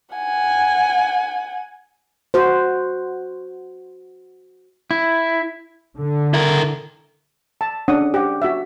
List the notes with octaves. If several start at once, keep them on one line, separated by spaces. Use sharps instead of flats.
F#5 G#5
F#4 C5
E4
D3
E4 A#4
A5
C#4 D4 F#5 D#6
G4 F#5
F#4 E5